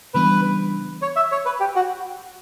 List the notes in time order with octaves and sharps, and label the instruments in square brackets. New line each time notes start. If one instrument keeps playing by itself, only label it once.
[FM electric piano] C#3 E3 G3 B3 D4 [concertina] B4
[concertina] C#5
E5
C#5
B4
G4
F#4